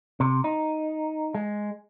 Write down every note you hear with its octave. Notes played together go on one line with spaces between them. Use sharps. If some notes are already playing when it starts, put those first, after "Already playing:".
C3
D#4
G#3